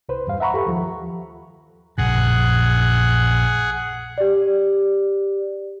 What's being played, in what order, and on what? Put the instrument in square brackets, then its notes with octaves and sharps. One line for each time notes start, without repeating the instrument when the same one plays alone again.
[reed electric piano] C2 B4 C5
E2 G2 F5
E5 F#5 A#5 B5 C#6
G4 A4
D#2 F3
[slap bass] A#1 F#2 C#3 [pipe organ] G#4 F#5
[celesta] G4 D5